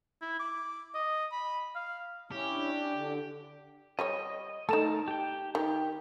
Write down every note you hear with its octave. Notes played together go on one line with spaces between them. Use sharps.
E4
D6
D#5
B5
F5
C#4 E4 G4
D4
D3
G3 G4 C#5 D#5
A3 D#4 A4 A#4 A5
G4 G5
D#3 G4